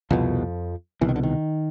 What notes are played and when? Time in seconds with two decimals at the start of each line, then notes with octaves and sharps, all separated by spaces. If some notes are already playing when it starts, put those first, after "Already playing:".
0.10 C2 F2 B2 F3
1.01 C2 B2 E3
1.09 D#3
1.16 D3
1.23 D#3